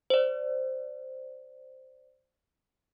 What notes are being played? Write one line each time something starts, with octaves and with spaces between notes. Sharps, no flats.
C5 D5